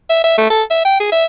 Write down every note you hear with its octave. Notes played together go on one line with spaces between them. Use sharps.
E5
E5
A3
A4
E5
G5
G#4
E5